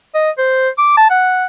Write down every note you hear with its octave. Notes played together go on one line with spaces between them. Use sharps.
D#5
C5
D6
A5
F#5